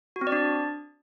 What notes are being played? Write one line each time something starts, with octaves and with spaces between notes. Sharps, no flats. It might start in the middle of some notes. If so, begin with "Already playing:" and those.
F#4
C4
D5
D4